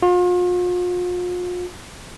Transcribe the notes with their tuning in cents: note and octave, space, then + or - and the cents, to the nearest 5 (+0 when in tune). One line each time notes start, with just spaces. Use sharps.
F4 +40